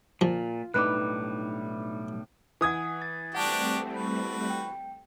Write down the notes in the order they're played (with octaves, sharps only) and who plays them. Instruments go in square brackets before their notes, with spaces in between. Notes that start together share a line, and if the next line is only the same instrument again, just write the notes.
[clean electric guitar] A#2 [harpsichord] F3 [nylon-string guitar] F4
[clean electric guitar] B1 A2 G3 [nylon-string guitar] D4 D#4 B4 [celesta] D6 F#6
[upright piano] E3 D#6 G#6 [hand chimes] F#5 G#5
[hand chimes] A6
[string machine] G3 A3 C4 [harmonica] D4 F#4 G4 [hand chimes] F#5 A5
[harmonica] F#4 B4
[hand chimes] G5